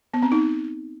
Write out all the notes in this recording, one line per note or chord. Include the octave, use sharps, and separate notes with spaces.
B3
C4
D#4